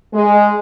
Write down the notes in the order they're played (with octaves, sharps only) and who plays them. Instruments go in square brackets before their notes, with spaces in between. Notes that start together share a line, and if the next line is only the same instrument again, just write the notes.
[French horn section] G#3